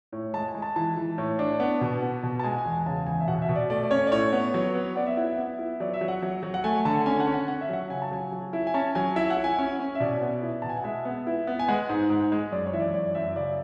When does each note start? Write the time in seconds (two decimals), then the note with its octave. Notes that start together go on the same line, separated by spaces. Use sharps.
0.12 A2
0.34 G#3 A5
0.48 G#5
0.55 G#3
0.62 A5
0.76 E3 A5
0.97 E3
1.18 A2
1.39 D4
1.60 B3
1.81 B2
2.02 B3
2.23 B2
2.39 A5
2.44 G#3 G#5
2.51 F#5
2.58 G#5
2.65 E2
2.72 G#5
2.86 C#3 A5
3.07 E2 G#5
3.20 E5
3.28 B2 F#5
3.42 E5
3.49 B2
3.56 D5
3.70 A3 D5
3.83 D5
3.91 C#4 C#5
4.07 D5
4.12 A2 C#5
4.32 B3
4.54 F#3
4.75 B3
4.96 B3 D5
5.07 E5
5.17 E4 F#5
5.27 E5
5.38 B3 E5
5.59 E4
5.80 F#3 D5
5.94 E5
6.01 F#3
6.08 F#5
6.22 F#3
6.43 F#3
6.54 F#5
6.64 A3 G#5
6.85 D3 A5
7.06 C#4 G#5
7.20 F#5
7.27 C#4
7.34 F#5
7.48 C#4 F#5
7.61 E5
7.69 F#3 F#5
7.90 C#3 G#5
8.02 A5
8.11 F#3 G#5
8.32 F#3
8.53 E4
8.67 G#5
8.74 C#4 A5
8.95 F#3 G#5
9.16 E4 E5
9.30 F#5
9.37 E4
9.44 G#5
9.59 C#4
9.79 C#4
9.95 E5
10.00 B2 D5
10.21 B3
10.42 E4
10.62 B2 A5
10.69 G#5
10.77 F#5
10.84 G#3 E5
11.05 B3
11.27 E4
11.47 B3
11.59 G#5
11.68 G#3 F#5
11.89 G#2
12.10 G#2
12.32 G#3
12.52 F#2 D5
12.66 C#5
12.73 E3 E5
12.80 D5
12.94 F#2 D5
13.15 F#2 E5
13.36 C#3 D5